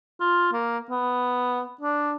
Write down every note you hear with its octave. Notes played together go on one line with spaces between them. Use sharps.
F4
A#3
B3
D4